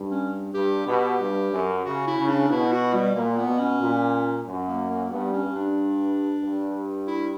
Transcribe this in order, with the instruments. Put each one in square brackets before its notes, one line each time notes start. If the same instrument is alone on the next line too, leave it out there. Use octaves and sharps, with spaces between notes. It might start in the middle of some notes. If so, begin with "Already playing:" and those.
Already playing: [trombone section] G2
[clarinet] C#4
[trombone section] G2 [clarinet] G4
[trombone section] B2 [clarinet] G4
[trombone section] G2
F#2
[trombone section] C#3 [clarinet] F#4
[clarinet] E4
[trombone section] C#3
[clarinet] D4
[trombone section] B2 [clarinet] E4
[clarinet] F#4
G3
[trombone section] A#2 [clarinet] A#3
[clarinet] B3
[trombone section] B2
[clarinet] C#4
[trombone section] A#2
F#2
[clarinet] A#3
A#3
[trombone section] G2 [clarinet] B3
[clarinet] C#4
[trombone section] G2
[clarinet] D4
[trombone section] G2
[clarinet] E4